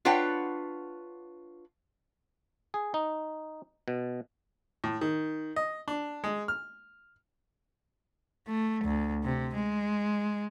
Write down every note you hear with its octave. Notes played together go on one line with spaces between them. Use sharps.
D4 F4 B4 C#5 F#5 G5
G#4
D#4
B2
A2
D#3
D#5
D4
G#3
F6
A3
D2
C3
G#3